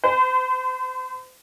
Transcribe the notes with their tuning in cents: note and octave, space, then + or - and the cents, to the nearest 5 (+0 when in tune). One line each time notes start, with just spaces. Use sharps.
C5 -40